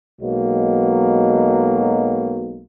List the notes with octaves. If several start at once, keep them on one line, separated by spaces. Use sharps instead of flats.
B1 B2 F#3 G#3 A#3